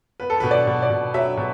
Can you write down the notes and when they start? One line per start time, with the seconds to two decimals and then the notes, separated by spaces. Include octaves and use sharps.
0.20 B3 B4
0.30 A4
0.40 B4
0.43 B2
0.51 D5
0.67 B2
0.82 D5
0.90 B2
1.14 F#3 E5
1.37 B2